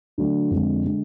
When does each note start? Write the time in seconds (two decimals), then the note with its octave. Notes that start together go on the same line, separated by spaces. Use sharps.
0.18 D3 F#3 A3 D4
0.51 F2 D3 G#3
0.85 D3 G#3